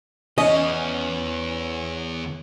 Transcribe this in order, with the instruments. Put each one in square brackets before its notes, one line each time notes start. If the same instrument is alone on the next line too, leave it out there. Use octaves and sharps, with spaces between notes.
[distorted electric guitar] E2 [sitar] C#4 [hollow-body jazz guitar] D#5